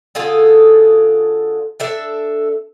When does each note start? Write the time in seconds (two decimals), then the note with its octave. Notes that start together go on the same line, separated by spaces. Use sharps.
0.15 D3 F4 G#4 A4
1.80 D4 A4 E5